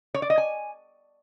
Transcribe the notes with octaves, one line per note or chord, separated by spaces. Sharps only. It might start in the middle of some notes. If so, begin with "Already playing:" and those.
C#5
D5
D#5
G#5